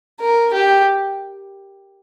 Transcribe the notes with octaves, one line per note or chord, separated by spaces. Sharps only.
A#4
G4